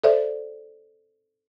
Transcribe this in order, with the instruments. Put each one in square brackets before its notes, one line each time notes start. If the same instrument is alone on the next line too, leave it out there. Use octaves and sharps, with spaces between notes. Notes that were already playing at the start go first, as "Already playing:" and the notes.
[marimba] A4 C5 D5 E5